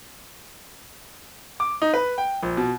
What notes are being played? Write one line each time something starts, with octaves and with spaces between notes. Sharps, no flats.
D6
D#4
B4
G5
A#1
B2